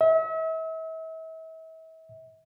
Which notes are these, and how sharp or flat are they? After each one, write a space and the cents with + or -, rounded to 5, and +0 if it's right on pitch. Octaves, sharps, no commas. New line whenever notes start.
E5 -40